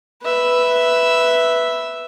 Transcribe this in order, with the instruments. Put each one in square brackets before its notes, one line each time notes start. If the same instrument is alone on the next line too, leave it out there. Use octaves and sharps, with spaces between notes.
[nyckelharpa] B4 E5